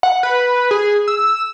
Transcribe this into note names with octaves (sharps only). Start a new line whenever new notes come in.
F#5
B4
G#4
E6